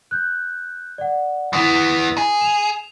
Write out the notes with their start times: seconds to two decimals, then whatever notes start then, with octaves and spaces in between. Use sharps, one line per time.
0.11 F#6 G6
0.98 D5 F#5
1.53 E3 B3 E4 D#6
2.18 G#4
2.41 E7 F7